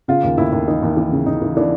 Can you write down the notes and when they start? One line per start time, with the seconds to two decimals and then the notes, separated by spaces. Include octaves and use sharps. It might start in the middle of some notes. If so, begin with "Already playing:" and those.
0.08 C#3 F4
0.24 D#2
0.38 D#2 E4
0.53 D#2
0.68 E3 D#4
0.83 D#2
0.97 E3
1.12 C#3
1.26 C#3 D#4
1.42 E3
1.57 E3 D4